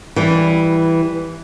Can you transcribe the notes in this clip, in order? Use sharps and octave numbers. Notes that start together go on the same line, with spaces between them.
E3 G3